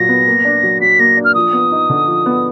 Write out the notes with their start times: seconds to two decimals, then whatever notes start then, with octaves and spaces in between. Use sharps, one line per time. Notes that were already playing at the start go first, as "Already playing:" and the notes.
Already playing: A#2 F#3 A#6
0.09 B3
0.27 A#3
0.45 D4
0.63 F#3
0.81 F#3 B6
0.99 A#3 A#6
1.17 D4
1.25 F6
1.35 F3 D#6
1.53 B3
1.72 D#4
1.89 D3
2.07 F3
2.26 B3